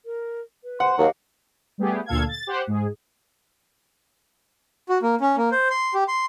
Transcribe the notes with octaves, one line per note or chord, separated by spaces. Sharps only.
A#4
B4
C5 F#5
D#2 F#3 G4 D#5 F5
G3 A3 B3 G4 G#4
D2 A#2 A4 F5 G#6
A6
G4 C5 F#5
G#2 G#4
F#4
A#3
C#4
A#3
C5
C6
G4
C6